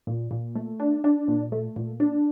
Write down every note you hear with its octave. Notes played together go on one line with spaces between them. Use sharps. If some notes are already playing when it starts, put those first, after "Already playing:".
A#2
A#2
A3
D4
D4
A#2
A3
A#2
D4